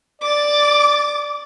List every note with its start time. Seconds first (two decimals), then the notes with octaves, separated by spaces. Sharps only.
0.21 D5 D6 A6